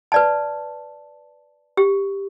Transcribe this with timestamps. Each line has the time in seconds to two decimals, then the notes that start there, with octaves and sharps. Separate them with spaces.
0.12 B4 D5 A5
1.77 G4